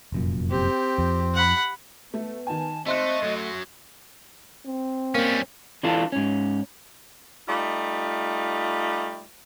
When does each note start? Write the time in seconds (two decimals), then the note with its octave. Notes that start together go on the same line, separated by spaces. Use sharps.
0.12 F1 F#2 A#2
0.50 C4 G4
0.98 F2
1.34 F#5 B5
2.14 A3 B3
2.47 D#3 G#5 A5
2.86 A3 C4 D#5 E5 C6 F#6
3.22 F#2 F#3 A3
4.66 C4
5.15 G3 A#3 C#4
5.83 E3 D4 F4 A4
6.12 G#2 C#4
7.47 G3 A3 D#4 F4